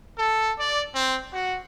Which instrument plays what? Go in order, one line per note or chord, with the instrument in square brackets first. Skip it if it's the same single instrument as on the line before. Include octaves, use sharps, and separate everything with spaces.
[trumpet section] A4
D5
C4
F#4